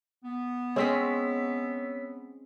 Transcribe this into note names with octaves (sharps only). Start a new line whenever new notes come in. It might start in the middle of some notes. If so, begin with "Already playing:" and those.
B3
G#3 C4 C#4 C#5 E6 B6